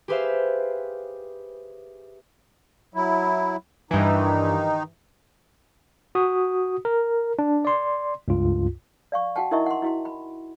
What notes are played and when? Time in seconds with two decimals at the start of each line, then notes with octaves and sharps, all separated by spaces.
0.08 G4 G#4 B4 C5 E5 F5
2.94 F#3 E4
3.91 G2 D#3 E3 D#4
6.15 F#4 D#6
6.85 A#4
7.39 D4
7.65 D5 C6
8.28 C#2 G2 F4
9.12 D5 F5 C#6
9.36 F#4 F#5 G5 A5
9.51 D#4 E4 A#4 D#5 E5 C#6
9.66 F#5 C6
9.82 E4 F#4 C6
10.05 B5